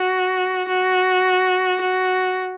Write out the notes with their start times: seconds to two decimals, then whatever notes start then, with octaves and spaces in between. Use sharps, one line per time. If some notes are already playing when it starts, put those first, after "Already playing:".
Already playing: F#4
0.68 F#4
1.81 F#4